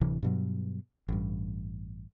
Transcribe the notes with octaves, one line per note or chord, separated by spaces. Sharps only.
D1 C3 E3
G2 B2 F#3
A1 G2